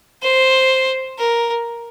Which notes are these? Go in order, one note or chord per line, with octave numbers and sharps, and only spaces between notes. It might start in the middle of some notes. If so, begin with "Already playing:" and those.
C5
A#4